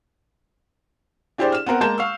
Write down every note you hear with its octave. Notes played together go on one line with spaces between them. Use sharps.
D4 E4 G4 G#4 C5 D5
F6 E7
B3 C4 A#4 F#5
G#3 A#3 A5 A#5 G6 E7
F5 C#6 E6